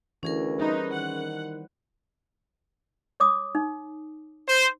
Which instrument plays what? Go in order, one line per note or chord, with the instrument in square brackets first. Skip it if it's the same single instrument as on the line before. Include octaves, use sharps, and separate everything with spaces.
[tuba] D2 [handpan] E3 [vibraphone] C#4 G#4 A#4
[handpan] G3 B4 C5 [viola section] D#4
[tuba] D#3 [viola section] F#5
[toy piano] C#5 D6 D#6
D#4
[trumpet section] C5